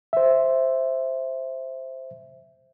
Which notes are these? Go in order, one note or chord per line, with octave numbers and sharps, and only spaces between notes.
C5 E5